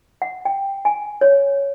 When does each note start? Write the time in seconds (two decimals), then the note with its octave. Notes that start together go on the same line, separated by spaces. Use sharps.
0.22 F#5
0.45 G5
0.85 G#5
1.21 C#5